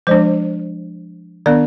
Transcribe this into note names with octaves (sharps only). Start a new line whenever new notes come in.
F3 G#3 D4 C5
D#3 B3 D4 D5